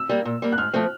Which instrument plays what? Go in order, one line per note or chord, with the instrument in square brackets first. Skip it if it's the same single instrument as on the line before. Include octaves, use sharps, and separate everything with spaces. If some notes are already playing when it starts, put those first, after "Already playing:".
Already playing: [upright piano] E6
[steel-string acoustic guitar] G3 A#3
A#2
G3 A#3
[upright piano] F#6
[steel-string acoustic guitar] G#2 [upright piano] F6
[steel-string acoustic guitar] F3 A3 C4